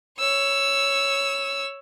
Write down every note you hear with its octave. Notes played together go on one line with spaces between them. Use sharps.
C#5 E6